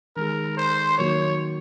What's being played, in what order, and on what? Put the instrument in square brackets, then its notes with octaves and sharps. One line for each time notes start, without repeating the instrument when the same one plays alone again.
[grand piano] D#3 G#3 D#4 G#4 [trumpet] A#4
[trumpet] C5
[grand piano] D#3 F#3 A#3 [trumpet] C#5